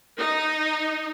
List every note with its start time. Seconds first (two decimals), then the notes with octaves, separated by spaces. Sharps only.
0.18 D#4